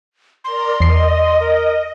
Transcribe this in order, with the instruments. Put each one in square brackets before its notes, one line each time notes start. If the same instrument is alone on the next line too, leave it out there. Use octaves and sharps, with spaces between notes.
[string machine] A#4 D5 A#5 [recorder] C6
[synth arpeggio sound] E2 C7 [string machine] D#5
[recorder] A#4